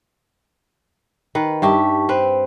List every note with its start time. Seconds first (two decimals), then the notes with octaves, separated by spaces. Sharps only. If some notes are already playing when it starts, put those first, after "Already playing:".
1.35 D#3 B4
1.62 G2 D#4 G4 E5 A5 C#6
2.09 C4 B4 C5